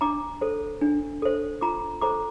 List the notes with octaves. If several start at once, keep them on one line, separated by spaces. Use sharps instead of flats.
D4 A#5 D6
A4 C5
D4
A4 C5
F4 A#5 D6
A4 C5 A#5 D6